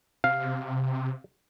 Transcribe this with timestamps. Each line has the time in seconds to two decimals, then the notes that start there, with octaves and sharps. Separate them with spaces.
0.24 C3 F5